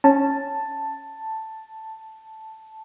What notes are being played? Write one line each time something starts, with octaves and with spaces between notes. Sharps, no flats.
C#4 A5